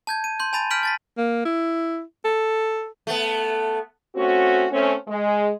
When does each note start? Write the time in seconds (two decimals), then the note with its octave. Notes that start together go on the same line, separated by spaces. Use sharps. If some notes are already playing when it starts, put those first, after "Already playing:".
0.07 A5 G6 G#6
0.24 D#7
0.40 C6 G6
0.53 G#5 A5 B5 A6 D#7
0.71 F6 G6 B6 D7 F#7
0.83 A5 A6 B6
1.17 A#3
1.45 E4
2.25 A4
3.07 A3 B3
4.15 A3 C4 C#4 F#4
4.71 A3 C4 C#4
5.08 G#3